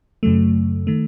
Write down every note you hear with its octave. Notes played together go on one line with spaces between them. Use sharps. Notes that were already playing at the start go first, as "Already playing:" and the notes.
F#2 C#3 F#3 A3
D#3 A3